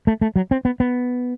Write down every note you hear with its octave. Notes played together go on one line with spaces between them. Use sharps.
A3
A3
F#3
C4
B3
B3